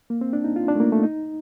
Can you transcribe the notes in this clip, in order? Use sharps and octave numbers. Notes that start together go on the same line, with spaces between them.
A#3
C4
D4
D#4
F4
D4
A3
A#3
A3
D#4